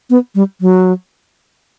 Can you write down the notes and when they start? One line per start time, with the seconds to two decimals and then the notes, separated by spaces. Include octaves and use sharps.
0.10 B3
0.35 G3
0.61 F#3